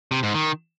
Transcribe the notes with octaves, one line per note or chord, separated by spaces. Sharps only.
C3
G#2
D#3